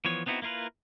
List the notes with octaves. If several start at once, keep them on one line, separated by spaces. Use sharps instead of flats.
E3 F3 B3 C#5
B3 C4 D#4 E4 F#4
A#3 E4 F4 A#4 B4